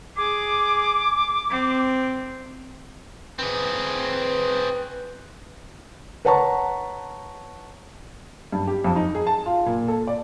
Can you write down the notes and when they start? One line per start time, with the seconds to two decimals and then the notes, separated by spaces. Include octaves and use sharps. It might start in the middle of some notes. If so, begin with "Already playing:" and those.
0.17 G#4 D6
1.50 C4
3.39 C4 G#4 B4
6.25 B4 C#5 F#5 A5 A#5 C#6
8.52 G2
8.67 G4
8.84 F2
8.96 D#4
9.15 G#4
9.27 A5
9.46 F4
9.66 A#2
9.88 A4
10.07 D5